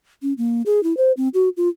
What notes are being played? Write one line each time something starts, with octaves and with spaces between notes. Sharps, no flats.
C#4
A#3
G#4
E4
C5
C4
F#4
F4